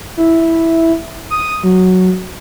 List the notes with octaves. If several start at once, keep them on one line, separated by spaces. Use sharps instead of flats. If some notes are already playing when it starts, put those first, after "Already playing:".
E4
D#6
F#3